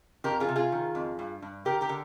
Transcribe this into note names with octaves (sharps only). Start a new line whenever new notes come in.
F2 G4 A#4
F4 G#4
C3
F4 G#4
D#3
F2
G2
G2
D3 G4 A#4
G4 A#4
D3